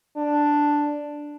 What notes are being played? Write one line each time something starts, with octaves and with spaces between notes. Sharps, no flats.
D4